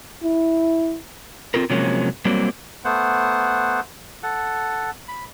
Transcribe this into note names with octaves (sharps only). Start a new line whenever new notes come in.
E4
C4 F4 A4 A#4
C3 F3 F#3 G#3 A#3 C#4
F#3 G3 A#3 C4
A3 B3 C5 F#5
A4 F#5
B5